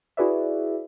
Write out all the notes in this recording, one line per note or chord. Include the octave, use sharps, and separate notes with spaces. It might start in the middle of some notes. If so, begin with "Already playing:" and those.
E4 F#4 G#4 B4 D5 E5